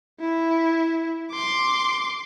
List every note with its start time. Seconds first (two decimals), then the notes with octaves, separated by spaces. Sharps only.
0.20 E4
1.31 C6 D6